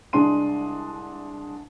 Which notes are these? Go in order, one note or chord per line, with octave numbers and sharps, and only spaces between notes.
C2 G#3 D4 G#4 C6 D#7